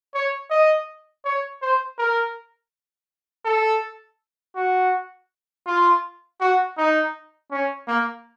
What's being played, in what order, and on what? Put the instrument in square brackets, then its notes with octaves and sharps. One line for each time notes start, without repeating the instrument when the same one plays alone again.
[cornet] C#5
D#5
C#5
C5
A#4
A4
F#4
F4
F#4
D#4
C#4
A#3